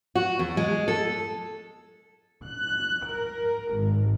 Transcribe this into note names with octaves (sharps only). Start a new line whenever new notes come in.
F#4
E2
G#3
A4
F#6
A#4
G#1